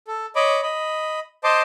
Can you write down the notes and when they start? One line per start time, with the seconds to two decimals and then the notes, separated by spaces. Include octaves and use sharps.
0.07 A4
0.36 C#5 D#5 B5 D6
0.63 D#5 B5
1.44 C5 D#5 A5 C6 D6